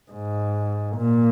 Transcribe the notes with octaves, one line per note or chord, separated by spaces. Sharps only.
G#2
A#2